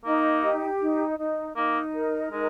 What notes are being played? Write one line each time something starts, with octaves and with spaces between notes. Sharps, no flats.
A#3 D#4
G4
D#4
D#4
A#3 D#4
A#4
G#3 D#4